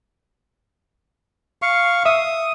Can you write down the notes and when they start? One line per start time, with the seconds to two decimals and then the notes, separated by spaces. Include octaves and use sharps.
1.62 F5 C#6
2.06 E5 D#6